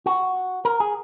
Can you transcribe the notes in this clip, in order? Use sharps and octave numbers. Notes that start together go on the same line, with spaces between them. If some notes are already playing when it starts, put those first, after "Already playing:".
F#4
A#4
G#4